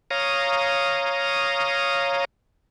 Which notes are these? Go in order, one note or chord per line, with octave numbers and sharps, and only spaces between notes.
C#5 F5 A#5 D#6